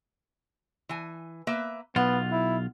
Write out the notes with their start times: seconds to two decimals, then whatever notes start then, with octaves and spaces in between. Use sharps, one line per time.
0.89 E3 G#5
1.47 A#3 B4 E5
1.96 B1 B3 F4 F#5
2.32 E4